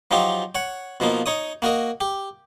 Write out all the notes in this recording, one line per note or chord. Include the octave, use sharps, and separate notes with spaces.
F3 F#3 D#4 F4 G4
C#5 F#5
B2 F3 A#3 D#4
D#4 C#5 D#6
A#3 F#4 A#4 D#5
G4